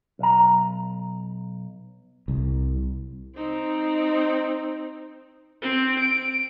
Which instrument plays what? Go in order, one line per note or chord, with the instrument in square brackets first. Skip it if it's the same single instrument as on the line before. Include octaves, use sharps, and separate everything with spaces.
[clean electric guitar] B1 A#5
[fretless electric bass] C2
[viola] C4 D#4
[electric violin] C4
D7